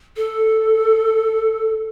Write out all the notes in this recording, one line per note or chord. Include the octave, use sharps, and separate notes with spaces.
A4